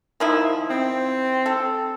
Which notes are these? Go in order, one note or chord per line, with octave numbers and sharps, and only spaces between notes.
D#3 F3 E4
C4
A4